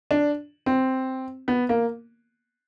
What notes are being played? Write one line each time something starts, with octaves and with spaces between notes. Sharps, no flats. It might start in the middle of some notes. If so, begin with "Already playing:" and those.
D4
C4
B3
A#3